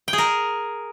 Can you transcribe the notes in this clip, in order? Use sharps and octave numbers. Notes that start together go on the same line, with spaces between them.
G5
G#4
A#4